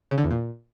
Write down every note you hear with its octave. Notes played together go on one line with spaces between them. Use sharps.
C#3
D3
E2
A#2